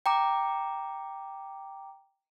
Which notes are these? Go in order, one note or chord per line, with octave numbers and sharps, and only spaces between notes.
G5 A#5 D6